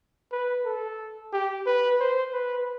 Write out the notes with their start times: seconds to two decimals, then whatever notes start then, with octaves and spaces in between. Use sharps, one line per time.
0.32 B4
0.65 A4
1.33 G4
1.66 B4
2.00 C5
2.33 B4